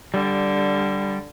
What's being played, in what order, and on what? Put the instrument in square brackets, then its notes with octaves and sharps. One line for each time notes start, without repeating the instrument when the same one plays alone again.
[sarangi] D3 [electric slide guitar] G3